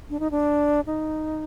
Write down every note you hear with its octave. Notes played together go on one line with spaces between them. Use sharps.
D4
D#4
D4
D#4